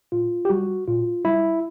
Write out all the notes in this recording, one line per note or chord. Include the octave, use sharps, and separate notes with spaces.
A#2 F4
G4
G3 F#4
A#2 F4
G3 E4